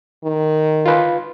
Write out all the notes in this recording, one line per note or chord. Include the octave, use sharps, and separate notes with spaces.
D#3
F4 B4